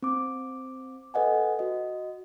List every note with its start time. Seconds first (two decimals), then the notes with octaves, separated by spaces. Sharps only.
0.02 C4 D6
1.14 A4 B4 D#5 F#5 G#5
1.59 F#4 D#5